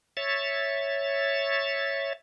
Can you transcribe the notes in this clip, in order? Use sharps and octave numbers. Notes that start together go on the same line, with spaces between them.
C#5 E5 A6